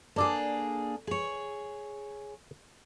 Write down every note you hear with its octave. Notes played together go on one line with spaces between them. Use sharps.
A#3 D4 G#4 A4 D5
G#4 C#5